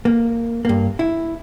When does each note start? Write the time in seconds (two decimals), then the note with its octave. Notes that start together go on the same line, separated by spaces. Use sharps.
0.05 A#3
0.65 G2 A#3
0.99 E4